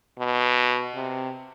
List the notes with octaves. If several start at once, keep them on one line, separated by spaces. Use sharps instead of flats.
B2
C3